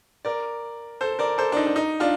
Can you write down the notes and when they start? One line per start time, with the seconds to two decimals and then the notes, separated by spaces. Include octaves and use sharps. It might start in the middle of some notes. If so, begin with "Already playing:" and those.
0.25 A#4 D5
1.01 A4 C5
1.19 A#4 D5
1.38 A4 C5
1.52 D4
1.57 D#4
1.67 D4
1.76 D#4
2.00 D4 F4